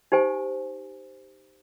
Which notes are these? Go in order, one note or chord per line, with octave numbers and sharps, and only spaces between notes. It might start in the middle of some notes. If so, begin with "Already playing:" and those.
D#4 G4 C5 G#5